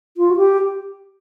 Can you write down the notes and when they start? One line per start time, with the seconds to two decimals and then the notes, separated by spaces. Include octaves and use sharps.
0.17 F4
0.31 F#4
0.37 G4